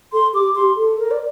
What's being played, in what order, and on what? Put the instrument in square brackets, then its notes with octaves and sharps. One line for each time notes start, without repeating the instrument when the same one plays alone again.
[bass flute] A4 [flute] C6
[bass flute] G4 [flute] D6
[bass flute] G4 [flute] C6
[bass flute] A4
[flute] A#4
D5